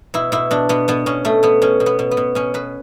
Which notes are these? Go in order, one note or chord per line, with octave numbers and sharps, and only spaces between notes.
B2 E4
B2 E4
B2 D4
B2 B3
B2 B3
B2 C#4
B2 A3
B2 B3
B2 C#4
B2
B3
B2
B3
B2
B2 C#4
B2 B4